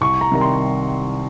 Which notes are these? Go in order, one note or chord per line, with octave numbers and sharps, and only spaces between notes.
C2 C#6
A#5
C3 D#3 G3 A#5
C6